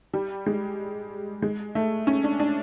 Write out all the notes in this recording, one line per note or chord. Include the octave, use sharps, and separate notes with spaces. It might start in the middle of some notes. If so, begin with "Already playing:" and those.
G3
G#3
G#3
A3
C#4
D4
D4